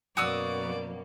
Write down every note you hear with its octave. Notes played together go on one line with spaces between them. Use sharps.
F#2 B2 A#3 F#4 D5 D#6 E6